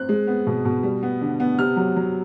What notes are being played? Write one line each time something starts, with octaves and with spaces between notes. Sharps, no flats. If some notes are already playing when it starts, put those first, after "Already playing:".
Already playing: C4 F#6
G#3
B3
B2
B2
G3
B3
D3
B3
C3 F6
F#3
F#3